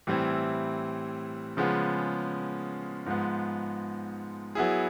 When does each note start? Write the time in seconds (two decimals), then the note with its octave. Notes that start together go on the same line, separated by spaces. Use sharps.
0.07 A2 E3 G3 C4 E4
1.57 C#3 F3 G#3 B3
3.06 G#2 F3 G#3 B3
4.55 F#3 B3 E4 G#4